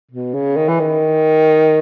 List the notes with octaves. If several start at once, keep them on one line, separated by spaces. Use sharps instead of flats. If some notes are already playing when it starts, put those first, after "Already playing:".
B2
C#3
D#3
E3
D#3